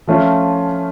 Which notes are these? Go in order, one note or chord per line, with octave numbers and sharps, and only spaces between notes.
F3 A3 C#4 F4